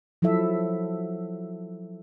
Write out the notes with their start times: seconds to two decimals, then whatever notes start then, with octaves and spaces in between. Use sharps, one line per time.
0.22 F3 F#3 E4 A4 E5